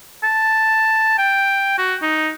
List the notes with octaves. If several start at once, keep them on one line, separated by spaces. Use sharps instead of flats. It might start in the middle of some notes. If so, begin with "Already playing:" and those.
A5
G5
F#4
D#4